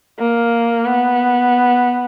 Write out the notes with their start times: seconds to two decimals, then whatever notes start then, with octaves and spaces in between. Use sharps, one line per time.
0.19 A#3
0.86 B3